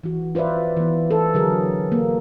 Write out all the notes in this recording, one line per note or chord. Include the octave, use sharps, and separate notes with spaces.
E3 F#4
F4 B4 C5 D5 E5
E3 B3
A4
D3 F#3 G#4 A#4
A#3